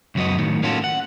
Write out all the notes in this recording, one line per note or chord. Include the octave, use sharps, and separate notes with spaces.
C#2 F#2 F#3 B3 D#5
A2 D#3 F#3
A#3 C#4 F4 F#4 A4
F#5